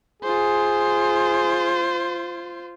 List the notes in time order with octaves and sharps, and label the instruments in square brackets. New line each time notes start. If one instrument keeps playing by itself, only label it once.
[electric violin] F4 C5 [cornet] G#4